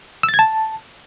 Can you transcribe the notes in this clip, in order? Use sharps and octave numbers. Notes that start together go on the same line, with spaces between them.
E6
A6
G#6
A5